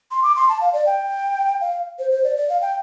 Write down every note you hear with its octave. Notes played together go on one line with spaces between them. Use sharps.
C6
D6
C6
A5
F5
D5
G5
F5
C5
C5
D5
D5
F5
G5